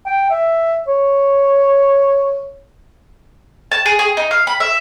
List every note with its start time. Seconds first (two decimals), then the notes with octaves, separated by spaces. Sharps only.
0.06 G5
0.30 E5
0.88 C#5
3.72 A5
3.86 G#4
3.99 G#4
4.17 D#4
4.31 F5
4.47 B5
4.60 E5